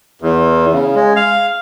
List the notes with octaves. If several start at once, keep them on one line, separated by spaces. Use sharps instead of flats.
E2
C#3
G#3
F5